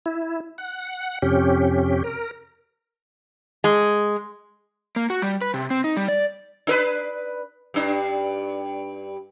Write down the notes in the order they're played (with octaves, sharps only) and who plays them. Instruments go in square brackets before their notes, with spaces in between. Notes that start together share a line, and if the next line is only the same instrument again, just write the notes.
[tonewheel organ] E4
F#5
F2 C3 C#4 G4
A#4
[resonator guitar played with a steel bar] G#3
[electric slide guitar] A#3
F#4
G3
B4
C3
C4
D#4
G3
D5
[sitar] D4 A#4 B4
G2 D4